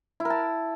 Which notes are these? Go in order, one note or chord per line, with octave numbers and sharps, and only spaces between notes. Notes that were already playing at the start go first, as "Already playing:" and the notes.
E4
A#4
A5